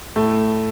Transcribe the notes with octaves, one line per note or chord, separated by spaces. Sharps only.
A2 A3